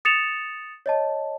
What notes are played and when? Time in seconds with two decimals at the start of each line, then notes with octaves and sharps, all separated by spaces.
0.05 D#6 A6 C#7 E7 F7
0.86 C#5 D#5 A5